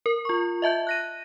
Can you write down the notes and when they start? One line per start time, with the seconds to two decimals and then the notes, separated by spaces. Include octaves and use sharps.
0.06 A#4
0.25 F4 C#6
0.62 D#5 E5 A5 G6
0.87 F#6 A#6 D#7